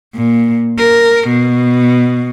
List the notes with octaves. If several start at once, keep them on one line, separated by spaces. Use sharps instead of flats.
A#2
A#4
B2